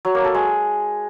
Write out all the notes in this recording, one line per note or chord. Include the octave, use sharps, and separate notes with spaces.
F#3
A#3
A4
G#3